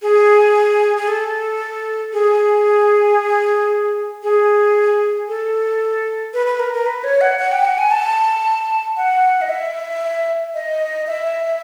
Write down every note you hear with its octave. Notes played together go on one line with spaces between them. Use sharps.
G#4
G#4
A4
G#4
G#4
A4
B4
B4
A#4
A#4
B4
C#5
F#5
F#5
G5
F#5
G#5
A5
F#5
D#5
E5
D#5
E5